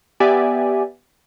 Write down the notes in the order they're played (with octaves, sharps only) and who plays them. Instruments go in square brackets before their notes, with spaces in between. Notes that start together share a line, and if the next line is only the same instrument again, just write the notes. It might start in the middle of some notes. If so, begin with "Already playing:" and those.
[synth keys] B3 G4 D5 E5 G#5